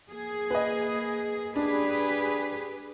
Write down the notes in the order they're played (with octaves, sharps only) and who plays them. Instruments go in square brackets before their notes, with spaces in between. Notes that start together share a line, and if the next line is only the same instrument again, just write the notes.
[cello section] A#3 G#4
[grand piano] B4 D#5
[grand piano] D4 [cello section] G4 G#4 B4